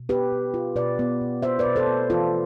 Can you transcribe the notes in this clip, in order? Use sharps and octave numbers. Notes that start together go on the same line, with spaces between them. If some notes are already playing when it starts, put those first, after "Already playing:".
Already playing: B2
B3 G4 B4
B2
F4
B2 B4 D5
B3
B2
F4 C5 E5
B4 D5
B2
A4 C5
B3
E3 F4 A4